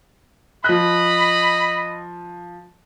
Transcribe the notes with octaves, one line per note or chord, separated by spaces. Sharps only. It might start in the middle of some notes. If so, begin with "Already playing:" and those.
F3 D#5 B5 F#6